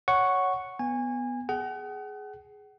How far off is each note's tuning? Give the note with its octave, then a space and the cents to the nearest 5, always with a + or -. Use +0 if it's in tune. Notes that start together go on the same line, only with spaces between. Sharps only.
C#5 +10 F#5 +0 C#6 +0
B3 +0 G#5 -25
G#4 +10 F#5 +35